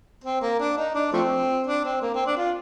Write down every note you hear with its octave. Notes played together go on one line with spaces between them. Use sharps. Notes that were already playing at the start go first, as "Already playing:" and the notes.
C4
A#3
D4
D#4
D4
F3 A3 C4
D4
C4
A#3
C4
D4
F4